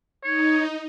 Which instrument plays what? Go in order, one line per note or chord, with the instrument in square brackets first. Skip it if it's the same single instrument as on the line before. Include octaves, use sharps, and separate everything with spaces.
[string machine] D#4 [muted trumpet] C#5